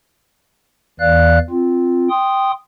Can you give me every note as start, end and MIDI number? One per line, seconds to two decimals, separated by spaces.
1.00 1.39 40
1.00 1.39 52
1.00 1.39 74
1.00 1.39 77
1.00 1.39 90
1.50 2.09 60
1.50 2.09 65
2.10 2.51 79
2.10 2.51 84
2.10 2.51 87